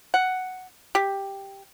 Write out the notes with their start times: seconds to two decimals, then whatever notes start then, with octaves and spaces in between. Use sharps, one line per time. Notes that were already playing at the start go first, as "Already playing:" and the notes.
0.14 F#5
0.95 G4